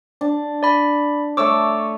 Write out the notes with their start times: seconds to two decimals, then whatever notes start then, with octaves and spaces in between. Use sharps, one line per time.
0.21 D4
0.63 D5 B5
1.37 A3 A4 C#5 D6 E6